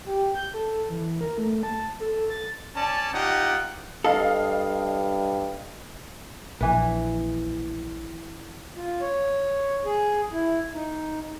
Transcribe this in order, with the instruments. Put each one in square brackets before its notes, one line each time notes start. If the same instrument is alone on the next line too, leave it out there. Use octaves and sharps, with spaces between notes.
[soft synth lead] G4
G6
A4
E3
A#4
A3
A5
A4
A6
[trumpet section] C#4 D5 A5
D#4 F4 G4 F#5
[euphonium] G2 [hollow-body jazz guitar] A4 [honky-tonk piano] D#5 F5
[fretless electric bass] A#1 [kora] E3 B4
[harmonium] F4
C#5
G#4
E4
D#4